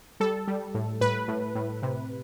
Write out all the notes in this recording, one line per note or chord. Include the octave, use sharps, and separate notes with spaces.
G3 A4
G3
A2
A2 B4
A2
A2
C3